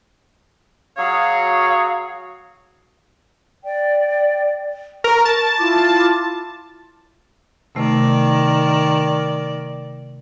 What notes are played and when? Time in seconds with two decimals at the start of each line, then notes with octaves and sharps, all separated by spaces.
0.96 F#3 F#4 G#4 C#5 F5
3.65 D5 G5
5.04 A#4 C#6
5.25 A5
5.59 E4 F4 D6
7.76 C3 D#3 A3 D5